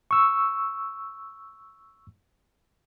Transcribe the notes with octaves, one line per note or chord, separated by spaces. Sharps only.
C#6 E6